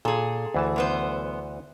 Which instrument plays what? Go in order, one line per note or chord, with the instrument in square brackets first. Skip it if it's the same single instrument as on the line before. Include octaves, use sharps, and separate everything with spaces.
[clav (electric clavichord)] A#2 [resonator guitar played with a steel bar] G#4 A4
[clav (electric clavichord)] D2 E3 A5
[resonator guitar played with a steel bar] F#2 B3 C5